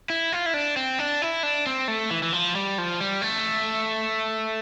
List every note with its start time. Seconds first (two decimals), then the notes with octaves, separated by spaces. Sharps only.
0.10 E4
0.32 F4
0.46 E4
0.54 D4
0.76 C4
0.99 D4
1.22 E4
1.43 D4
1.66 C4
1.88 A3
2.11 E3
2.23 E3
2.33 F3
2.55 G3
2.78 F3
3.01 G3
3.22 A3